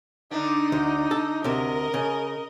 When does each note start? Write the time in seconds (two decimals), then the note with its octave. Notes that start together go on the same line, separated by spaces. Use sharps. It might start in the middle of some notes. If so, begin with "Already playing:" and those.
0.31 D3 D4 D#4
0.72 D2
1.11 A4
1.44 D2 C3 A#4 D#5
1.94 C#3